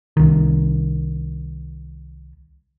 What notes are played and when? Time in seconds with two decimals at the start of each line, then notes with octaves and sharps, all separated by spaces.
0.17 C2 D#3